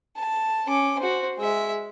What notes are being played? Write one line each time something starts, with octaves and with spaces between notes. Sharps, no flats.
A5
C#4 D6
F#4 C5
G#3 E5